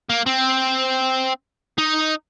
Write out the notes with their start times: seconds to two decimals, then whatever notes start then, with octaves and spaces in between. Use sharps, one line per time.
0.10 A#3
0.26 C4
1.78 D#4